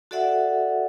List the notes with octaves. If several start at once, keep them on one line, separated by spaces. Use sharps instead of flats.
F#4 A4 D5 E5 F#5